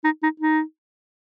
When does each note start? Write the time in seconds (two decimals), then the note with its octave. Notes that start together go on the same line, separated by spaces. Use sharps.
0.04 D#4
0.23 D#4
0.40 D#4